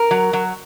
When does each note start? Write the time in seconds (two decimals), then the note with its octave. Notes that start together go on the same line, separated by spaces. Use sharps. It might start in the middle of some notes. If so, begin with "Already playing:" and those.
Already playing: A#4
0.11 F#3
0.33 F#3